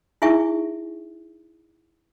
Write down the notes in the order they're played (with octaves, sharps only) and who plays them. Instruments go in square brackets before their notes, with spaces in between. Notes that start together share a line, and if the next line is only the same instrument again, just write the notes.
[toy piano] D#4 E4 G#4 E5 G#5 C#6